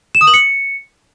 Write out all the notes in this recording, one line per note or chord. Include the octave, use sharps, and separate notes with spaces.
E7
D#6
F#7
C#7